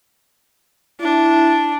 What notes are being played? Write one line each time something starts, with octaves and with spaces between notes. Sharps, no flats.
D4 E4